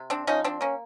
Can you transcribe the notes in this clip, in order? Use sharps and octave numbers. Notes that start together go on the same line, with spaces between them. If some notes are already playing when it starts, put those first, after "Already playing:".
Already playing: C3
C4 D4
F3 C#4 D#4
C4 D4
A#3 C#4